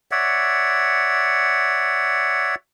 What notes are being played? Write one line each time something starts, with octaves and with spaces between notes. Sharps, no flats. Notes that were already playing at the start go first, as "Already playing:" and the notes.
C#5 D5 E5 F#5